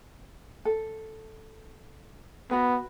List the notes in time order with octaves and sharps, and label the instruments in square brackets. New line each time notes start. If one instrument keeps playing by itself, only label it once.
[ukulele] A4
[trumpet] B3 [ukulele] F#4 B4